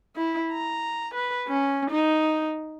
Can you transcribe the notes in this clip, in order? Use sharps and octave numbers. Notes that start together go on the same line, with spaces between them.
E4
A#5
B4
C#4
D#4